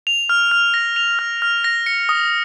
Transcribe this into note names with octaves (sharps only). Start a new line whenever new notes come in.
F7
F6
F6
A#6
F7
F6
F6
A#6
C#7
D#6